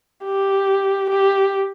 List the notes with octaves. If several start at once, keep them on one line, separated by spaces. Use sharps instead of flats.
G4
G4